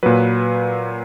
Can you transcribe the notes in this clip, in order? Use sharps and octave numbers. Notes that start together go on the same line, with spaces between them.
A#2 F#3 B4